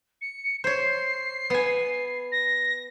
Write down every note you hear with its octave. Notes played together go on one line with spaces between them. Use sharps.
C#7
C5 C#5 C7
B3 G#5
A#6